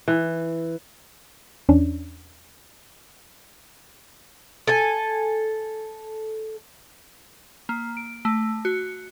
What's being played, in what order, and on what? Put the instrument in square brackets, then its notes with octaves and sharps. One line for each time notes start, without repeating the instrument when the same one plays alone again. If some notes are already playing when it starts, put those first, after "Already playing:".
[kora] E3
[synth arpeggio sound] E2 C#4 D4
[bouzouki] A4 G#5
[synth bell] A#3
D7
A3
F#4